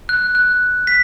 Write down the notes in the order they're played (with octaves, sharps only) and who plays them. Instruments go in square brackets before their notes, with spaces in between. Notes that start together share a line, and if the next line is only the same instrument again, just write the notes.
[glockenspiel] F#6
F#6
B6